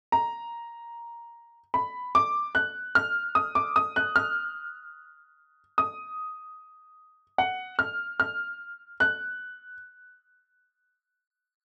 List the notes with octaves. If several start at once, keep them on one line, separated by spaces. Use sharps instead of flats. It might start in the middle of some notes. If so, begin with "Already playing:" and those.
A#5
B5
D6
F#6
F6
D#6
D6
D#6
F#6
F6
D#6
F#5
F6
F6
F#6